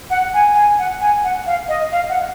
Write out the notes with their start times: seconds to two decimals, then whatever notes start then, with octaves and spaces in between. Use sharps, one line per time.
0.10 F#5
0.34 G#5
0.55 G#5
0.79 F#5
1.01 G#5
1.24 F#5
1.46 F5
1.68 D#5
1.92 F5
2.09 F#5